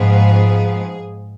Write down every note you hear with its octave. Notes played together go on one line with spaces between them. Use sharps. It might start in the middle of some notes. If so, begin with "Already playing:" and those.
Already playing: G#2 F3 B3 G#4